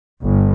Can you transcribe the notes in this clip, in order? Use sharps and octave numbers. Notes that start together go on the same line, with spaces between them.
G1